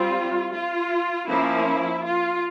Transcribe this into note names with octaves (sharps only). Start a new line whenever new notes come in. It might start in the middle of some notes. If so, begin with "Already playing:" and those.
Already playing: G3 C4 F4
F4
F3 A#3 C#4 E4
F4